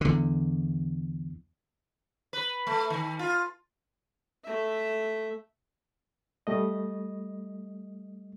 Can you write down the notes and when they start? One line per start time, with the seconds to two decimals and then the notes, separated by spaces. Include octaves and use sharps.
0.01 E2 D3
2.33 B4
2.67 A3
2.90 D#3
3.19 F4
4.44 A3 E5
6.47 G3 A3 D#5